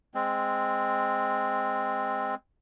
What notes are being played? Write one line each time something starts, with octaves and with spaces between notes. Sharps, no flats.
G#3 C4